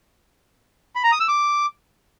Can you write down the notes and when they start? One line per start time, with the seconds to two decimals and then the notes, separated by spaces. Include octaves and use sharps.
0.95 B5
1.04 A#5
1.12 D#6
1.20 E6
1.28 D6